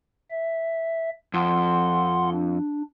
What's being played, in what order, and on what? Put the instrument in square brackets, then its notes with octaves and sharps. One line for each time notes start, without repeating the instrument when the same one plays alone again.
[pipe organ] E5
[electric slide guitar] F2 [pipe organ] F#5 C6
[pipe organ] D4